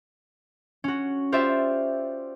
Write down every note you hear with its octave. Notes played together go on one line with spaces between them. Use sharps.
C#4 F#4
F4 G4 C5 D5 E5